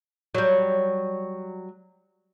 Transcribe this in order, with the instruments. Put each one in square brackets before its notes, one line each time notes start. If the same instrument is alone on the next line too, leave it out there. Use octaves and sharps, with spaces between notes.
[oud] F#3 G3